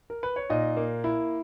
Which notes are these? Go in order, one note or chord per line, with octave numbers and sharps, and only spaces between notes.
A#4
B4
C#5
A#2 D#4 D#5
A#3
E4